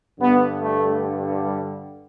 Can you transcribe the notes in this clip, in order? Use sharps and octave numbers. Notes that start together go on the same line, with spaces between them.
G2 D3 B3
A3
G3